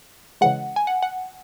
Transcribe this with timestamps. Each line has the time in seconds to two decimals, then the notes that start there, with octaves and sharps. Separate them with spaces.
0.41 C#3 E3 G#3 F#5
0.76 G#5
0.87 F#5
1.02 F#5